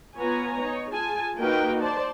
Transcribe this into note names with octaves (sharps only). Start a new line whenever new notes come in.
B3 F4 C#5 G#5 A#5
D#4 C#5
F4 G#4 G#5 A5
A#3 D#4 F#4 A#4 B4 G5
C5 D5 A5